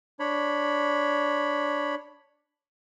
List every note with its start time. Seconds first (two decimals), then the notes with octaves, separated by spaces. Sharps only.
0.20 D4 C#5 B5